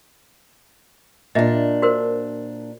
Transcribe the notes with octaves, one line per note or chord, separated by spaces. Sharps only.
A#2 D4 D#5 E5
F#4 A#4 C5